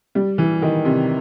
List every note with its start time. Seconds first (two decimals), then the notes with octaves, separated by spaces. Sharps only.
0.15 G3
0.38 E3
0.62 D#3
0.85 C3